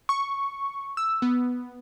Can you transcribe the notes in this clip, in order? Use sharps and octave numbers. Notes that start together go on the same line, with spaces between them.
C#6
E6
B3